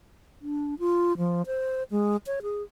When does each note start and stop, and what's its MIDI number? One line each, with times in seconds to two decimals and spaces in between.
0.42 0.75 62
0.79 1.17 65
1.18 1.42 53
1.46 1.83 72
1.91 2.17 56
2.27 2.40 73
2.42 2.62 68